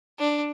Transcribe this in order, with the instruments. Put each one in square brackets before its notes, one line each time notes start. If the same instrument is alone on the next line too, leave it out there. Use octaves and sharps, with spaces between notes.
[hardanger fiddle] D4